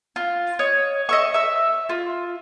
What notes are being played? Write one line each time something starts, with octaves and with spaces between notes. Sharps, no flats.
F4
C#5 D#5
D#5 E5 C#6
E5 E6
F4